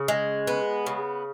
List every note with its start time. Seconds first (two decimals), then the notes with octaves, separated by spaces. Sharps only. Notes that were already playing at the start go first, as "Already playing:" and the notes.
Already playing: C#3
0.08 G#3
0.47 B3
0.86 C#3